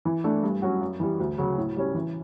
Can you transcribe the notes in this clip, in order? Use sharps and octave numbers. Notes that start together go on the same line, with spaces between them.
E3
A3 D4
G2
F#3 C#4 F#4
F#2
E3 G3
D2
C#3 F#3
A2
G3 C#4
E3